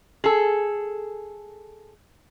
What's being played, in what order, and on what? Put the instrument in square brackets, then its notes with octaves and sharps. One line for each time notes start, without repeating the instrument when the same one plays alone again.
[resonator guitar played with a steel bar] G#4 A4